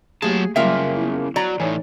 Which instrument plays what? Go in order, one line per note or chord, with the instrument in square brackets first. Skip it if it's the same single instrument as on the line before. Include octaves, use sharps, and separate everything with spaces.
[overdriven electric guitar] F#3 A5 [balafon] A3 A#3 G4 [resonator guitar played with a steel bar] G#4
[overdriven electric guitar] C#3 A#3 [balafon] F#3 G3 G5 [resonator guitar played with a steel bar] F4 A#4 E5
[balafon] B3 E4
[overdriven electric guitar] F#3 [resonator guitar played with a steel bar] D5 A#5
[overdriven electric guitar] A2 E3 [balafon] D#4 C#5 G#5